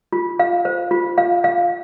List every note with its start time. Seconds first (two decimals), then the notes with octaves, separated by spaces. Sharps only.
0.12 F4
0.39 F5
0.65 C5
0.91 F4
1.18 F5
1.44 F5